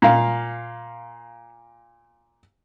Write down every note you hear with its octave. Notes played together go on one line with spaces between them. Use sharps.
A#2 F5